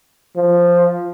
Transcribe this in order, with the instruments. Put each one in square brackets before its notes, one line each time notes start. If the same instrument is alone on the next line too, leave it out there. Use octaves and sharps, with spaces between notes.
[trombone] F3